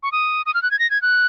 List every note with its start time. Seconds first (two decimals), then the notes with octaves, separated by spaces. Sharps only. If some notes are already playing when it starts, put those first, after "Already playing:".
0.03 C#6
0.12 D#6
0.46 D#6
0.54 F6
0.63 F#6
0.71 G#6
0.79 A#6
0.90 G#6
1.02 F#6